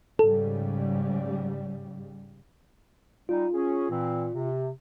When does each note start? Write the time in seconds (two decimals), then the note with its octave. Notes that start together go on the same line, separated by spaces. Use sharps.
0.19 G#2 C#3 G3 A4
3.29 G3 G#3 D#4 F4
3.53 C#4 G#4
3.90 A#2 E3 C4
4.34 C3